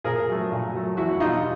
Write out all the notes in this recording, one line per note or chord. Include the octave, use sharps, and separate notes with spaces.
A#2 G#4 A#4
F#3 A3
A#2
F#3 A3
E2 E4 F#4
B2 G3 D#4 F4